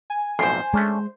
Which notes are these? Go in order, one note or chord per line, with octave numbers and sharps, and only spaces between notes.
G#5
B1 F2 A2 C5 C6
G#3 A3 C#4 D4